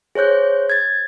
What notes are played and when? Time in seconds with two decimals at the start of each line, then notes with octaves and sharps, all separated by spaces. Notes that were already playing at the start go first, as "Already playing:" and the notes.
0.15 G#4 C5 C#5 F#6 G6
0.70 G#6 A6